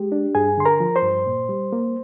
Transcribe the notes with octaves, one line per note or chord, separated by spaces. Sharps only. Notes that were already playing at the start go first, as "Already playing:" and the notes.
Already playing: G#3 G4
D4
G2 G#4 G#5
D3 C6
A#4 A#5
F3
C5 C6
G2
A#2
G3
A#3